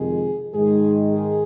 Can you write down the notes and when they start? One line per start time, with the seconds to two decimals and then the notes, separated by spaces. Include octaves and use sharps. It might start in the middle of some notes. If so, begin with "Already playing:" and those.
Already playing: F2 C3 D#3 G#3 G#4
0.53 G#2 D#3 G#3 G#4
1.13 G#4